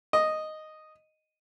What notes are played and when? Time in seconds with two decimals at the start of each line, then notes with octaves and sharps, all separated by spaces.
0.13 D#5